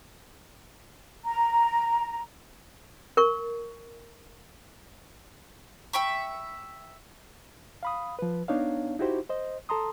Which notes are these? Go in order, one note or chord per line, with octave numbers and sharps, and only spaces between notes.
A#5
A#4 C#6
E5 G5 B5 C#6
F5 B5 D#6
F3 B4
B3 D4 D#4 C#5 F5
D#4 E4 F#4 G4 C5
C5 D#5
A4 A5 A#5 C6 D#6